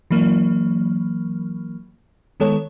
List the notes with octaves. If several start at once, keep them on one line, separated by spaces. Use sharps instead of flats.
E3 F#3 A#3
D#3 G#3 B3 A4 C#5